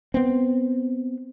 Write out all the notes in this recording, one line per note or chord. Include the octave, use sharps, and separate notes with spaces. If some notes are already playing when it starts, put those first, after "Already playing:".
B3 C4